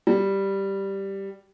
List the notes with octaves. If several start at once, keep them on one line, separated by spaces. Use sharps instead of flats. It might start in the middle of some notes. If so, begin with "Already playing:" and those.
G3